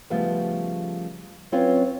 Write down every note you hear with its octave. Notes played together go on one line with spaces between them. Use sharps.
C#3 F3 G3 A3 B3
F#3 C4 C#4 F4 B4 C#5